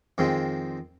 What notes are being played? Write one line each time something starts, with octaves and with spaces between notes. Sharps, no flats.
F2 D#3 G#3 C4